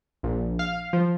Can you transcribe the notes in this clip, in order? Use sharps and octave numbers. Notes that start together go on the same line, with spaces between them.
A#1
F5
F3